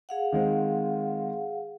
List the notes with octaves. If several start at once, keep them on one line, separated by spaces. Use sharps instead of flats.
G#4 F5 F#5
D#3 G#3 C4